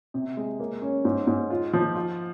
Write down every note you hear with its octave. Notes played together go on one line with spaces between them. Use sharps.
C3
G#3
A#3
C#4
G#2
G#2
F4
F3
F4